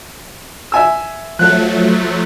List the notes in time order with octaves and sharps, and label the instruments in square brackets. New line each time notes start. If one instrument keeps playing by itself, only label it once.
[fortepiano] E5 G#5 E6
[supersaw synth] F3 F#3 A3 [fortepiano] F#6